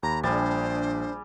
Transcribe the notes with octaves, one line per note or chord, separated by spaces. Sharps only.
D#2 A#5 B5
A#1 G3 D4 G#4 C5 A6